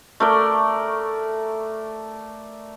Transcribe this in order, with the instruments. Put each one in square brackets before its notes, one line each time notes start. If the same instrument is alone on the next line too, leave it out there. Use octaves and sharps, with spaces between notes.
[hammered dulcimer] A3 A#4 D5